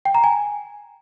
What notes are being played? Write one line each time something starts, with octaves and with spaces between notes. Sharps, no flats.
G5
A#5
G#5